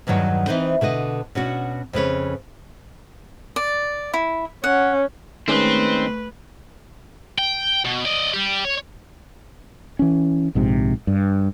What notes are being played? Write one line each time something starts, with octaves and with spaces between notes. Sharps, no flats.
E2 G2 D#3 F#3 B3
E3 C4 D#4 B4 C5
B2 D3 B4 D#5
B2 C#4 D4 F#4
F2 C#3 B4 C#5
D5
E4
C#4 F#5
D#3 G#3 A3 C4 C#4 B4
G5
B2
D5 D#5
G3 G4
C#5
E3 C#4
A#1 G#2 C3
G2